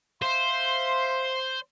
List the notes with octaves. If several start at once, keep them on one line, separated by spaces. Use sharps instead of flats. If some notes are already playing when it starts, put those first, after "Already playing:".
C5 E5 F5 C6